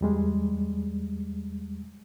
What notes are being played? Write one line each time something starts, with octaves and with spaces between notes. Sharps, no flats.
E2 G3 G#3